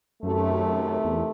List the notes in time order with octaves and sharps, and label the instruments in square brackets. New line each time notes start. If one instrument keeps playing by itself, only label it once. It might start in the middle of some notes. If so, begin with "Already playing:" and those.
[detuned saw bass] F#2 [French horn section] C3 D#3 A3
[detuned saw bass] E2